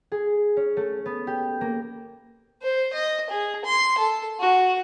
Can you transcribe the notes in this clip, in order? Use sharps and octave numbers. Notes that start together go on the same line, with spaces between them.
G#4
C#4
A3
B3
G4
A#3
C5
D#5
G#4
C6
A4
F#4